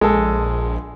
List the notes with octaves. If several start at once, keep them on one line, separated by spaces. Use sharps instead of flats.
A#1 G#3 A4